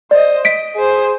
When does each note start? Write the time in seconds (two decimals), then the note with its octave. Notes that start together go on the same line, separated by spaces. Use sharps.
0.11 C5 D5 D#5
0.45 D#5 B6 D7
0.77 G#4 C5